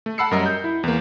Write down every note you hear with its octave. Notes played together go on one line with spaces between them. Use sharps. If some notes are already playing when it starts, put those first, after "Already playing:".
A3
F#5 A5 B5 E6 C7 C#7
F#2 G3 A#4 D#5
G6
E4
E2 A#3